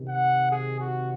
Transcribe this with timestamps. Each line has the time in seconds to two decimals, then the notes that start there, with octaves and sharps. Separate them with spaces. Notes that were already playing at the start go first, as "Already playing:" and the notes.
Already playing: C3 D#3
0.08 F#5
0.52 G#4
0.80 F#4